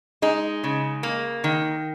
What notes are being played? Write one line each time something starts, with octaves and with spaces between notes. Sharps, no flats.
G#3 D#4
C#3
A#3
D#3